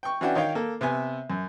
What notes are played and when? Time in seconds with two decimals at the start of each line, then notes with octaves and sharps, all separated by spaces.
0.03 G5 C#6
0.21 E3 C#4 D4 F#4 F#5 G5
0.35 D#3 C#5 D#5 F5 G5
0.55 A#3 A4
0.81 C3 B3 E5 G#5
1.30 F#2